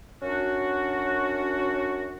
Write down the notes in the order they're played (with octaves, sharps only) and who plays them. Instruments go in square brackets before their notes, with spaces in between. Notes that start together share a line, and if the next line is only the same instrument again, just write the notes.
[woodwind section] F#2 C#4 D4 F#4